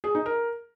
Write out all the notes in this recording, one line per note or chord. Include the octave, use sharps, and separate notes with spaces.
G#4
D#4
A#4